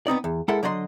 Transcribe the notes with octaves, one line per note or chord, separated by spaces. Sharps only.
B3 C4 D#4 D5
E2
G#3 E4 A4 A#4 E5 F#5
D3 F#3 D5 D#5 C6